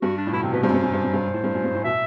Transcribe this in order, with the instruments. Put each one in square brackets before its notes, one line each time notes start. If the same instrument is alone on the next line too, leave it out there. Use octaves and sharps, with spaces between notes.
[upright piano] G2 [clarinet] F#4
[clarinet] D4
[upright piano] A2
[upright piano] B2 [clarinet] E4
[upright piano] C3 [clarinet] C4
[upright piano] B2 [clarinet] B4
[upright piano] G2 [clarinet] C5
[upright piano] F#2
G2
F#2
G2
F#2
G2
A2
G2
F#2
G2
A2
[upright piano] B2 [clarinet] E5